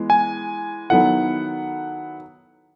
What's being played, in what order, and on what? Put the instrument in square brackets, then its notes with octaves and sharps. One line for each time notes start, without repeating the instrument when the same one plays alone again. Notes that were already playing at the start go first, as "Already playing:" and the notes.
Already playing: [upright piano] E3 G#3 B3
[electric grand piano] G#5
[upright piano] D#3 F#3 B3 E4 A4 [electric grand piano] F#5